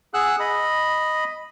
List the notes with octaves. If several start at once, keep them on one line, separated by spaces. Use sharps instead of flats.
G#4 F#5 E6 F#6
D#5 B5